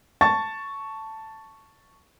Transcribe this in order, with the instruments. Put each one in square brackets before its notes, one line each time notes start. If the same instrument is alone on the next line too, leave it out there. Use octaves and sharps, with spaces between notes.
[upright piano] A5 C#6 A6